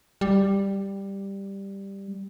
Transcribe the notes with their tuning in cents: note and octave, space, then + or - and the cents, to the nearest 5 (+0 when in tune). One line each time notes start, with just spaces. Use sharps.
G3 +5